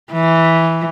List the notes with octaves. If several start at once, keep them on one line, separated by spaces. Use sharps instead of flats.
E3